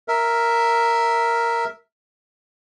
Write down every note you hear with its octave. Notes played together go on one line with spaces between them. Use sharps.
A#4 E5